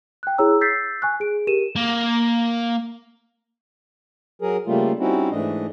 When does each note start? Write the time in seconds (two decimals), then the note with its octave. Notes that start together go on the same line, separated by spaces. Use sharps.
0.23 G5 F#6
0.38 E4 G#4 C#5 A#5 E6
0.61 E6 G6 A6 B6 C7
1.02 G#5 C#6 F#6
1.20 G#4 D7
1.47 G4 A#4 D#7 E7
1.76 A#3
4.42 F#3 G#4 A#4
4.67 C#3 G3 A3 A#3 F4
4.99 G3 C4 C#4 D#4 E4 F#4
5.30 G#2 E3 A3 D4 D#5